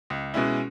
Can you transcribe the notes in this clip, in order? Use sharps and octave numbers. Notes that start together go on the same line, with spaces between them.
C#2
B2 G#3 C#4 E4